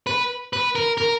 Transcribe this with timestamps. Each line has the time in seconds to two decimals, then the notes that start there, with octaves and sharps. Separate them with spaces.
0.07 B4
0.53 B4
0.75 A#4
0.98 A#4